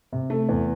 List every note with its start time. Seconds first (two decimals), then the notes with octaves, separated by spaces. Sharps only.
0.12 C3
0.30 A3
0.49 E2